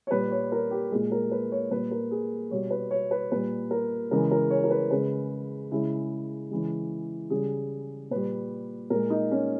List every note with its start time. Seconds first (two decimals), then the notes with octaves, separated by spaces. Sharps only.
0.07 C#5
0.11 A#2 G3 B4
0.31 C#5
0.52 A#4
0.71 G4
0.92 A#2 G#3 G#4
1.12 A#4
1.31 B4
1.52 C#5
1.71 A#2 G3 B4
1.91 A#4
2.11 G#4
2.51 B2 G3 C#5
2.71 B4
2.91 C#5
3.11 B4
3.32 A#2 G3 B4
3.71 A#4
4.11 C#3 E3 G#3 A#4
4.31 A#4
4.50 C#5
4.64 A#4
4.70 B4
4.91 C#3 G#3 B4
5.71 C#3 G#3 E4
6.51 C#3 E3 G#3
7.30 C#3 G3 G#4
8.11 A#2 G3 B4
8.90 A#2 G#3 A#4
9.10 D#4
9.31 C#4